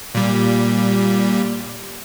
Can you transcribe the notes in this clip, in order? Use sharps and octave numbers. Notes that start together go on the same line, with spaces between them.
A#2 G3